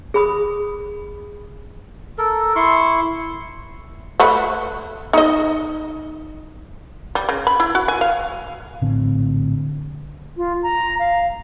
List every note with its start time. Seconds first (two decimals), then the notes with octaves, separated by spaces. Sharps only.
0.14 G#4 B5 D#6
2.18 A4 A#4
2.56 E4 C6 C#6
4.20 A3 B4 F#5
5.13 D#4 D#5
7.15 G3
7.29 C#3
7.47 B5
7.60 E4
7.75 F#4
7.88 G#5
8.01 F5
8.81 A#1 A2 D3 C4
10.37 F4
10.63 A#5
10.99 F5